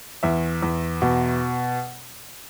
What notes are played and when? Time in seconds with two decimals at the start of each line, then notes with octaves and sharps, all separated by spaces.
0.23 E2 E5
0.62 E2
1.02 B2